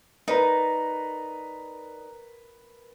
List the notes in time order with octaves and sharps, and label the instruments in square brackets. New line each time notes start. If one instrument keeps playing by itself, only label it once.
[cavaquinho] D#4 [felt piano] A#4 B4 [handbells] D5 A#5